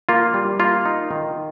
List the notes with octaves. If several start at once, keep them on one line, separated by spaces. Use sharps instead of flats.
A#3 F4
G3
A#3 F4
D#4
D#3